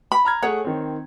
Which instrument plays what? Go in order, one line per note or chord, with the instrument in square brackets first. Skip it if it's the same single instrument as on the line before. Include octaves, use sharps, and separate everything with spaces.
[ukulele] B5
[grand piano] A#5 F6 G#6
[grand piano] A3 G#4 F#5 [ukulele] C#5
[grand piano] D#3 C4